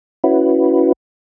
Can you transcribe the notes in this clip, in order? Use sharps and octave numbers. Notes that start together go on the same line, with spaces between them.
C#4 E4 F#4 B4